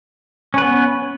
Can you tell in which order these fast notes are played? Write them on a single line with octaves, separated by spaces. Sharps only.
C#4 B4 B3